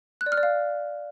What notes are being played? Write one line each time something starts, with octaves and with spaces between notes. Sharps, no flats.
F#6
D5
F6
D5
F5